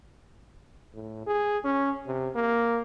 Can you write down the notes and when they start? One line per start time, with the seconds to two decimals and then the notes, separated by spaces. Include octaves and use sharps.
0.95 A2
1.27 G#4
1.64 C#4
2.07 C3
2.35 A#3